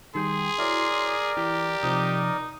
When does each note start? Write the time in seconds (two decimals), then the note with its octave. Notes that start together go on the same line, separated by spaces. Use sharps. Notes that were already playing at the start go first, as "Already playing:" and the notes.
0.15 D#3 G3 G#4 G5 C6
0.59 E4 F#4 A#4 C#5 D5
1.37 E3 G4
1.83 C3 F3 D#4